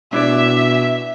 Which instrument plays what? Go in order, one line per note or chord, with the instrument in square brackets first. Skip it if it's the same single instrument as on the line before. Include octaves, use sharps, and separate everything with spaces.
[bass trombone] B2 [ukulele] D4 E4 D5 [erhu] E5